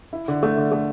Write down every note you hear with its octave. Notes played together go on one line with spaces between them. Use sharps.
E4
D3
A3
D3
A3